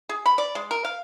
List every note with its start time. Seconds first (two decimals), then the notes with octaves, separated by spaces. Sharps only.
0.09 G#4
0.26 B5
0.38 D5
0.55 G#3
0.71 A#4
0.85 F5